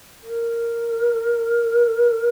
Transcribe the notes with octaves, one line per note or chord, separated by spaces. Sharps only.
A#4